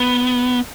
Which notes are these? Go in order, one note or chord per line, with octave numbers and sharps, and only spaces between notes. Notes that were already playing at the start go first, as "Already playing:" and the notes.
Already playing: B3